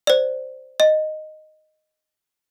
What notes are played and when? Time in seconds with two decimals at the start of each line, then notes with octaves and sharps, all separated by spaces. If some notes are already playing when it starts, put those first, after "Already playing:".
0.07 C5 D5
0.80 D#5